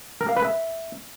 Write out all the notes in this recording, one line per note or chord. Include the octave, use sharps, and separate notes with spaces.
A#4
F5
B4
E5